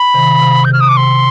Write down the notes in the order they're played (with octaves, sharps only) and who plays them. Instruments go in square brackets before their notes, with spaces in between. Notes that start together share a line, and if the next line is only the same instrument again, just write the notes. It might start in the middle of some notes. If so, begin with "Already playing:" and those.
Already playing: [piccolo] B5
[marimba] C3 D#3
C3
[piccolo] G6
[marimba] C3
[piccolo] F6
D#6
D6
[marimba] C3 [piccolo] C6